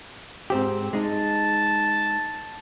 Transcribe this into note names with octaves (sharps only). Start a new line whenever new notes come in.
G#2 C4 G4
G#3 D#4 A5